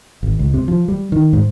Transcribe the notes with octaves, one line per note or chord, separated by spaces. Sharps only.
G#1
C#2
C3
F3
G3
D#3
G#2